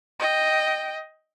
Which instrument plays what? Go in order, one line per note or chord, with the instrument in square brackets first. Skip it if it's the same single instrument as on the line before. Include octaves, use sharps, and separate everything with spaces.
[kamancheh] D#5 G5